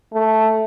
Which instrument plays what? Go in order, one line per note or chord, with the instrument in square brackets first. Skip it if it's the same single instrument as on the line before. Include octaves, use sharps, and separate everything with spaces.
[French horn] A3